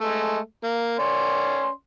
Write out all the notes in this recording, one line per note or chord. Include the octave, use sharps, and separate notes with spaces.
G#3 A3
A#3
C#4 D5 C6